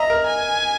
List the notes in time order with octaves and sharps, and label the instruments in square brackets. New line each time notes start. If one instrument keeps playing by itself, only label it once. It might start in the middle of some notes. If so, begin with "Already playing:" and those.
Already playing: [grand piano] D#5 E5 [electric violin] A#5
[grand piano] A#4
[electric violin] G#5